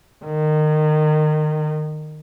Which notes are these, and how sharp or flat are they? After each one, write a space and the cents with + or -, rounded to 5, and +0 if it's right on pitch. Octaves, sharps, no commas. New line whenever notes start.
D#3 -25